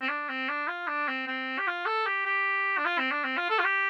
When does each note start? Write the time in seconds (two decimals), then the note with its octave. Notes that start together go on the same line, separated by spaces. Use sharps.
0.02 C4
0.09 D4
0.29 C4
0.49 D4
0.68 F4
0.87 D4
1.08 C4
1.27 C4
1.58 G4
1.67 F4
1.86 A4
2.06 G4
2.25 G4
2.78 D4
2.85 F4
2.99 C4
3.11 D4
3.24 C4
3.37 F4
3.50 A4
3.59 F4
3.64 G4